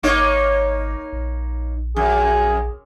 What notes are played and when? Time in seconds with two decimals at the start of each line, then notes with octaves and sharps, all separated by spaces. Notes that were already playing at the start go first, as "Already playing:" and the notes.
0.03 G#1 A#3 D#4 C#5
1.13 A#1
1.97 F#2 G#4